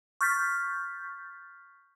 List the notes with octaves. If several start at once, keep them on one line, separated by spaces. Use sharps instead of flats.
C#6 F6 G6 A6 B6